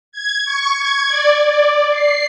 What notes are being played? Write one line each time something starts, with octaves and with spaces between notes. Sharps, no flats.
G#6
C#6
G#6
D5
D5
C7